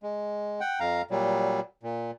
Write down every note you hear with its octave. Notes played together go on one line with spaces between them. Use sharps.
G#3
F#5 G5
F2 F5 A#5
A#2 F#3 G3
A#2